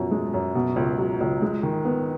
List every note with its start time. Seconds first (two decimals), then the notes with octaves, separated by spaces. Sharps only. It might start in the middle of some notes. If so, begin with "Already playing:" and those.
Already playing: F#2 B2 F3
0.11 G#3
0.34 F#2
0.55 B2
0.76 C#2
0.98 F#3
1.21 C#2
1.42 G#3
1.63 D#3
1.85 B3